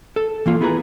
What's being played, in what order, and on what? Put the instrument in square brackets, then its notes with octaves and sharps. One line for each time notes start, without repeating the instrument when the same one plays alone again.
[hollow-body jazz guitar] A4
E3 A#3 F4
B3 E4 G4 G#4 B4 A#5